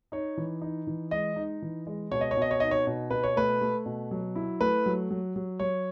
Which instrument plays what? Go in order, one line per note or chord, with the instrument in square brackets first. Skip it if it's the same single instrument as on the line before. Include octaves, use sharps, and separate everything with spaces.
[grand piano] D#4 C#5
E3
D#4
E3
G#3 D#5
D#4
E3
G#3
B2 C#5
D#5
C#5
B2 D#5
C#5
D#4 D#5
C#5
B2
B2 B4
C#5
A3 B4
A3
B2
F#3
E4
A3 B4
F#3
F#3
F#3
F#3 C#5